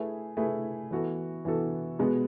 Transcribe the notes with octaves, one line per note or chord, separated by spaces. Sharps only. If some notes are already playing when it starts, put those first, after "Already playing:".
Already playing: A3 E4 G#4 B4
A3 E4 G#4 B4
E3 B3 F#4 A4
E3 B3 F#4 A4
B2 G#3 B3 F#4